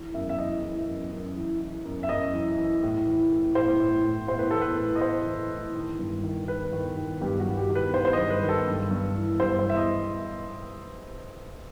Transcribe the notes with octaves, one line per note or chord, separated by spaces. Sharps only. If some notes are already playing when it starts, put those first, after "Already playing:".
Already playing: E3
F#2 E5
E5
E3 D#5
E3
F#2
F#2
E3
E3
F#2
E5
F#2 D#5
E3
E3
A2
E3
A2
A2 C5
A2
A2
A2 C5
B4
E3 A4
B4
A2
D#5
E3 C5
E3
A2
D#3
G2
D#3
D#3 B4
D#3
D#3
G2 G4
F#4
G2
G4
D#3
B4
D#3 C5
C5
D#5
G2
B4
D#3
A4
G2
G2
E3
G2 C5
C5
E3 E5
D#5